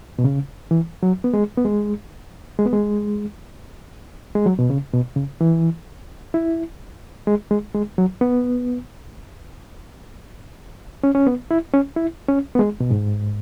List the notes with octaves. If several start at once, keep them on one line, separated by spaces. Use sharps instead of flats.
B2
C#3
E3
F#3
B3
G#3
B3
G#3
G#3
B3
G#3
G#3
F#3
B2
C#3
B2
C#3
E3
E4
G#3
G#3
G#3
F#3
B3
C#4
C#4
B3
E4
C#4
E4
C#4
B3
G#3
B2
G#2